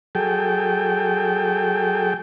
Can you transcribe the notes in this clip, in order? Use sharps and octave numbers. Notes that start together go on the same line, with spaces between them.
F#3 G#4 A4 G5